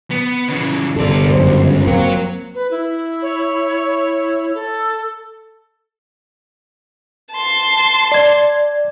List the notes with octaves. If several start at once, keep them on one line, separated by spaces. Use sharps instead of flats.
B3
C#3 E3
G1 C2 A4 D5
C#2 F#2 C5
F#3 A#3 C4
B4
E4
C#5
A4
A5 C6
D5 G#6